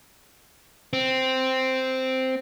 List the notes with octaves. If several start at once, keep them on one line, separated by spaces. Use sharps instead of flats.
C4